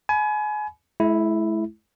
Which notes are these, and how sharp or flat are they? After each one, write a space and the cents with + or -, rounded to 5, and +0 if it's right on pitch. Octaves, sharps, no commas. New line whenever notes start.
G#5 +30 B5 +0
G#3 +45 E4 +0